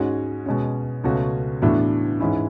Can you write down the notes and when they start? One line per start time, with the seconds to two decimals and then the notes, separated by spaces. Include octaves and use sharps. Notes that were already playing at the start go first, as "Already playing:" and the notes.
Already playing: G#2 G#3 C#4 F#4
0.46 B2 G#3 C#4
1.04 C#2 B2 A3 C#4 F#4
1.62 A2 E3 B3 D4 F#4
2.20 G#2 E3 G#3 C#4 E4